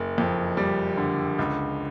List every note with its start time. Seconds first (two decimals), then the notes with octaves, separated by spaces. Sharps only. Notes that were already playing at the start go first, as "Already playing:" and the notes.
Already playing: F#1
0.18 F2
0.57 G3
0.97 D3
1.39 C#2